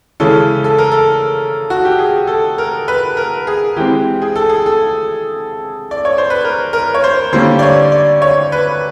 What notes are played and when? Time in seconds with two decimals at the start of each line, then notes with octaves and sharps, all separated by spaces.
0.20 C#3 E3 G#3 C#4 A4
0.64 A4
0.78 A#4
0.92 A4
1.70 F#4
1.85 G4
1.99 G#4
2.27 A4
2.58 A#4
2.88 B4
3.17 A#4
3.47 G#4
3.76 E3 G#3 C4 G4
4.22 G#4
4.36 A4
4.49 G#4
4.66 A4
5.91 D5
6.05 C#5
6.18 C5
6.30 B4
6.44 A#4
6.73 A#4
6.94 C#5
7.04 C5
7.33 D3 G3 A#3 C#4 C5
7.59 D5
7.62 C#5
7.92 D5
8.22 C#5
8.52 B4